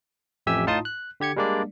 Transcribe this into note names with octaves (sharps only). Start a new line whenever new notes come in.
A1 F2 G4 E5 G#5 E6
A2 D#4 F4 A5 C6 D#6
F#6
D3 G4 G#6 C#7
G3 G#3 A#3 D4 D5